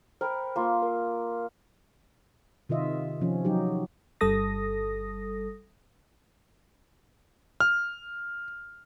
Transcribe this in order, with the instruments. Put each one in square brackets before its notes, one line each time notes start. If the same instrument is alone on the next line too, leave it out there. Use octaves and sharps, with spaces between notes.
[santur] A#4 [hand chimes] C5 G5 B5
[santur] A#3 F4
[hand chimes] A#4
[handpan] C3 D#3 F4 D#5 E5
C3 F3 C#4
F#3 D#4 G4
[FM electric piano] G1 G3 A4 D#6 A#6
[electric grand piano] F6